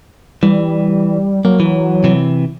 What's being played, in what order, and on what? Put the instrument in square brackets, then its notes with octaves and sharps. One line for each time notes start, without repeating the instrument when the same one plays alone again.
[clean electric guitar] E3 [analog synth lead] G3
[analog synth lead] F#3 [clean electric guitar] A#3
[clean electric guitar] E3
C3 E3